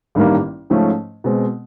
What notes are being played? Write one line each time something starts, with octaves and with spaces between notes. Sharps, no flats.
A1 G2 D#3 G3 A#3
G#2 F3 A3 C#4
B2 G#3 C4